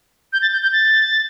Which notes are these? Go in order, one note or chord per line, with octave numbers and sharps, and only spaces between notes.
G6
A6
G6
G6
A6